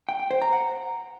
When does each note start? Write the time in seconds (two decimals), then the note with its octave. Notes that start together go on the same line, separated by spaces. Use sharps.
0.09 G5
0.20 G5
0.31 C5
0.42 A#5
0.53 F#5